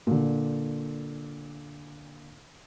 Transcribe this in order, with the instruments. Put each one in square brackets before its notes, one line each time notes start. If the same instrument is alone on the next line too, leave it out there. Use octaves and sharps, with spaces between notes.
[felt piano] A#2 D3